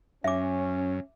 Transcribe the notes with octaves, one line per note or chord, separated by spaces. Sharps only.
F#2 C#4 E5 D6